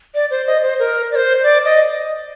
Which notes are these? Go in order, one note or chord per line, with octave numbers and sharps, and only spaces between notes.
D5
C5
D#5
C5
A#4
D5
C5
D5
D#5